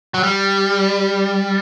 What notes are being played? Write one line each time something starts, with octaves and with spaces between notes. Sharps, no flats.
F#3
G3